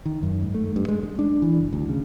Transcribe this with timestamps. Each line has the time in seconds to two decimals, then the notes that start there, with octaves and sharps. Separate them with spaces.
0.06 D#3
0.23 F#2
0.42 G#2
0.54 A3
0.76 G2
0.88 G#3
1.03 G#3
1.19 D4
1.42 E3
1.61 F#1
1.73 D2
1.89 C#3